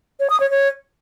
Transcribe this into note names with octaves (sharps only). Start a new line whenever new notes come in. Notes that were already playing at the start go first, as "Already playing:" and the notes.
C#5
D#6
C#5
C#5